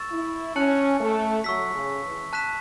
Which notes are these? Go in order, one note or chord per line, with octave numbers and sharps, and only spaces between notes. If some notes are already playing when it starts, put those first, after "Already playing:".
Already playing: C#6 E6 A6 E7
E4
C#4 A5 F#6 C#7 F#7
A3
F#3 C#6 E6 B6
C#3
E3
A5 F#6 B6 E7